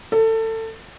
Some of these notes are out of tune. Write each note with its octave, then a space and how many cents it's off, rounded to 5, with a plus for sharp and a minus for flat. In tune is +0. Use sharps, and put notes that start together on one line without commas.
A4 +25